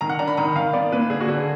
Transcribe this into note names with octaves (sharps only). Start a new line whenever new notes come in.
D#3 A#5
F#5
D4 A#5
B5
D#3 A#5
D#3 F5
B3 D5
A#2 B4
D3 G#4
F#4
D3 G#4